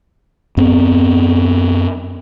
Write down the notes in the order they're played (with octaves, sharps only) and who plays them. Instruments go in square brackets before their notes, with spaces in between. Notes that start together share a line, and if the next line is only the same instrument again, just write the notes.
[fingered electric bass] F#2 B3 C4